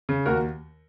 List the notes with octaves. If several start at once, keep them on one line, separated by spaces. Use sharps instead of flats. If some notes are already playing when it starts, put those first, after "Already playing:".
C#3
D#2 F#4 A#4